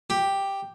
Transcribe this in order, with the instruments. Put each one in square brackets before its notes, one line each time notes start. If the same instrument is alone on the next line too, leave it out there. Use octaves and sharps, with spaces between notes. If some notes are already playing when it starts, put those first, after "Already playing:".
[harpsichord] G4